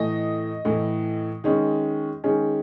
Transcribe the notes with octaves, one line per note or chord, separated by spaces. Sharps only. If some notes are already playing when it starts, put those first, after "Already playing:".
Already playing: A2 E3 A3 D#5
A2 E3 A3
D#3 G#3 C#4
D#3 G#3 C#4